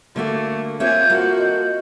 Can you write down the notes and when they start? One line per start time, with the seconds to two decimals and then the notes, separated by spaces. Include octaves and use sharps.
0.16 D3 A3 A#3 F#4
0.80 A#3 C4 F4 G#4 C#5 E5 G#5 G6
1.10 A#3 F#4 A4
1.39 D#5